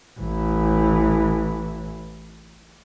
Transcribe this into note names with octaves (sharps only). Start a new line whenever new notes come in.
A1 E3